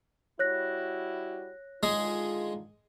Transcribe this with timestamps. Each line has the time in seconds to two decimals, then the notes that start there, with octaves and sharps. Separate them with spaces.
0.39 G3 E4 F#4 C#5 F#6 A#6
1.83 D3 D#3 G#3 F4 G#4